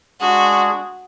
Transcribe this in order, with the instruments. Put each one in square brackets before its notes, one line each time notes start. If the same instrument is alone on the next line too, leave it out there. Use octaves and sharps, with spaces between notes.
[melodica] G#3 D4 G#4 [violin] F#4